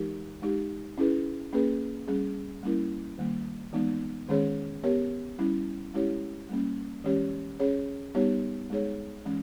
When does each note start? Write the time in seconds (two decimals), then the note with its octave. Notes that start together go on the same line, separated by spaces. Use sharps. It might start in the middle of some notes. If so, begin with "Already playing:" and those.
Already playing: E3 G#3 D#4 G4 A#4
0.42 G#3 D#4 G4
0.97 C#4 E4 G#4 B4
1.53 A#3 C#4 G#4 B4
2.08 G3 C#4 G#4
2.63 G3 A#3 C#4 E4 A#4
3.18 D#3 G3 A#3
3.73 E3 G#3 B3 D#4
4.28 D#3 G#3 C#4 G#4 C#5
4.83 B3 G4 A#4 C#5
5.39 G3 C#4 E4
5.94 G#3 C#4 E4 G4 C#5
6.49 G3 A#3 C#4
7.04 E3 G#3 C#4 G4 C#5
7.60 C#4 G#4 C#5
8.15 G3 B3 D#4 G4 C#5
8.70 G#3 D#4 G#4 C#5
9.25 E3 G#3 C#4